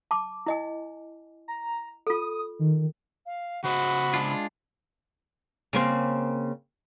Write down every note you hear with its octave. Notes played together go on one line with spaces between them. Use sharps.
A5 D6
E4 D#5 G#5
A#5
F4 A4 D#6
D#3
F5
C#3 F#4 C5 D#5 B5
G#3 D4 F4
C#3 A#3 C4